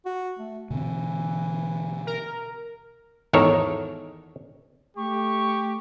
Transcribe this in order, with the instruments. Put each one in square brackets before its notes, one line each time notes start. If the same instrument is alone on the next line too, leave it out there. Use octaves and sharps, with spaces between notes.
[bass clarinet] F#4
A3
[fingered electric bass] B2 D3 C4 [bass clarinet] E3
[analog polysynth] A#4
[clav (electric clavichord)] G#1 E2 D#3 A4 A#4 C#5
[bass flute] A3 [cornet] G4 [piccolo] C#6